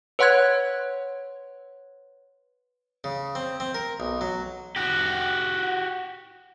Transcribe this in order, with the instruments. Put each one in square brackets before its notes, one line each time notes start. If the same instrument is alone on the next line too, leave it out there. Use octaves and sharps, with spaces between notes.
[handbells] B4 C#5 F#5 C6 F#6 G#6
[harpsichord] C#3
C4
C4
A#4
B1
F#3
[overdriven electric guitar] F#4 G4